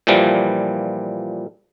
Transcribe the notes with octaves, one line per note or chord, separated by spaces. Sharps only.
A#2 E3 F3 G3